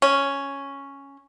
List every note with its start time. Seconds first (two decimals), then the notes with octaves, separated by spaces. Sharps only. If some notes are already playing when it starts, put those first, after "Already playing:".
0.02 C#4